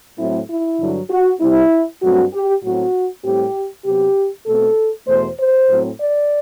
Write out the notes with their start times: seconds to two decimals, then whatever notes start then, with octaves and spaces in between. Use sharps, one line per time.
0.18 A2 F#3 A3 C4 E4
0.49 E4
0.80 G2 D3 F#3
1.10 F#4
1.41 C3 G3 C4 E4
2.02 G2 F#3 A3 C4 F#4
2.32 G4
2.63 A2 F#3 C4 F#4
3.24 A2 G3 C4 G4
3.85 C3 F#3 B3 G4
4.46 B2 A3 C4 A4
5.07 E2 B2 A3 C5
5.38 C5
5.68 A2 F#3 C4
5.99 D5